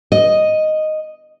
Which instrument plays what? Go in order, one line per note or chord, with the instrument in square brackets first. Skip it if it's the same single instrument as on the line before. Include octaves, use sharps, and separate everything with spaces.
[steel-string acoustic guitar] D#5